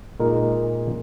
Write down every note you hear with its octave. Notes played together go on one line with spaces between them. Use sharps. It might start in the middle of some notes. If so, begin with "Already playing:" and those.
A#2 G#3 D#4 A#4